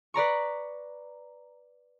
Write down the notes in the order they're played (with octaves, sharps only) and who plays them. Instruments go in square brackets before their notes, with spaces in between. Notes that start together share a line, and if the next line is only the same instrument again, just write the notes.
[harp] B4 D5 A#5 C#6